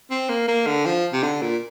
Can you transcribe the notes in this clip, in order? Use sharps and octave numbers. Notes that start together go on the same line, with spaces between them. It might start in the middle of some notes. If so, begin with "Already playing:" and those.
C4
A#3
A#3
D3
F3
C3
D3
A#2